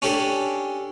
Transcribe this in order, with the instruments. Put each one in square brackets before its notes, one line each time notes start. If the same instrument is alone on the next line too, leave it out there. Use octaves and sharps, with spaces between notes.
[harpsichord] C#4 D4 G4 A4